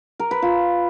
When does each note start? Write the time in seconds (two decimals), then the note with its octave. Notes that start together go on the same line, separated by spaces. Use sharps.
0.19 A#4
0.31 B4
0.42 F4